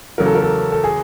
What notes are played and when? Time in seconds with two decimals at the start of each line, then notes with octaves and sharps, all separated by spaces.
0.18 E2 C#3 F#3 A3 A#4
0.26 A4
0.35 A#4
0.42 A4
0.72 A4
0.84 G#4